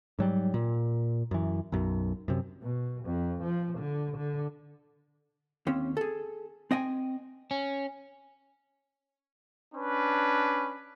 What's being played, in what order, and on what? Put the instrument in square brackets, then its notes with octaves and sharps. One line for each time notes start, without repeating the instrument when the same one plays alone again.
[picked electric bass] G#2 F#3 G3
A#2
F#2 E3
B1 F#2
F#2 C3
[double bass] B2
F2
F3
D3
D3
[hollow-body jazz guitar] D#2 C4 C#4
G#4 A4
C4 D#5 G5 G#5
[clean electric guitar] C#4
[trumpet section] C#4 D4 B4